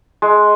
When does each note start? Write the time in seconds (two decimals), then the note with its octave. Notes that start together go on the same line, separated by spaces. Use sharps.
0.22 G#3